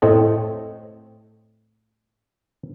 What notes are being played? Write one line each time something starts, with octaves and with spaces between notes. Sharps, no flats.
A2 A3 C4 D#5 A5